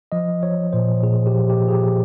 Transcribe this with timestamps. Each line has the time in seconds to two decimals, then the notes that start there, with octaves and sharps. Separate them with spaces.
0.12 F3 D#5
0.43 F3 C#5
0.73 A#2 C5
1.03 A#2 G#4
1.27 G4
1.34 F3
1.50 G4
1.65 F3 G#4
1.73 G4